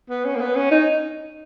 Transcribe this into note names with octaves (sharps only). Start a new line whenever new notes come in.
B3
C#4
A#3
B3
C#4
D#4